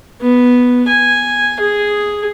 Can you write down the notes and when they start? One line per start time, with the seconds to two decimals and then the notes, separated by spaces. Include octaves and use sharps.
0.21 B3
0.88 G#5
1.60 G#4